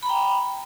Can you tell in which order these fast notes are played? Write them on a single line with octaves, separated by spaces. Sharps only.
B5 A#5 G5